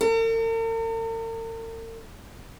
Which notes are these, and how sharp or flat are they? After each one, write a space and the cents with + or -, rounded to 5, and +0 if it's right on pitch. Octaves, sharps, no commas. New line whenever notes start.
A#4 -45